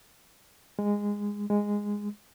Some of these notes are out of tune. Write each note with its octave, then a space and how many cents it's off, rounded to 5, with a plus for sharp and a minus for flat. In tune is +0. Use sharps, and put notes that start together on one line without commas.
G#3 -15
G#3 -10